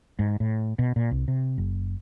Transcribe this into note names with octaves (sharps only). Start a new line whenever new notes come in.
G#2
A2
B2
A#2
C2
C3
F#1